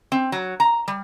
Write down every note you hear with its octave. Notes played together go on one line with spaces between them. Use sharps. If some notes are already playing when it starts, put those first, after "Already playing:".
C4
F#3
A#5
G3